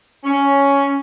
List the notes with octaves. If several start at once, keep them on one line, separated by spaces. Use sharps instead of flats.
C#4